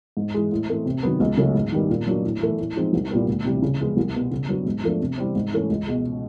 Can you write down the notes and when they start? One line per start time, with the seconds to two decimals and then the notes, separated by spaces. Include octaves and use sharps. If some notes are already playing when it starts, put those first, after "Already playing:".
0.17 G#2
0.34 E3 G#3
0.52 A2
0.68 E3 A3 C4
0.86 C3
1.03 D#3 F#3 B3
1.20 C#2
1.37 C#3 F#3 A3 C#4
1.55 G#2
1.72 D#3 G3 B3
1.90 A#2
2.07 F#3 A#3 D4
2.24 A2
2.41 E3 A3
2.58 A2
2.75 F3 G#3 C4 D#4
2.93 C2
3.10 A#2 G3 B3
3.28 D2
3.45 C3 E3 G3
3.62 C#3
3.80 F3 G#3 B3
3.97 C2
4.14 B2 G3 B3
4.31 C#3
4.49 F#3 B3 D4
4.66 G#2
4.83 F3 A3 D4
5.01 C3
5.18 E3 G3 C4
5.35 G#2
5.52 E3 A3 C#4
5.70 C#2
5.87 B2 G#3